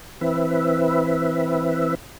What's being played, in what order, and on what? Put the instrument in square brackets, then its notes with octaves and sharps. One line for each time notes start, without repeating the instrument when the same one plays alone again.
[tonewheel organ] E3 C4 B4 E5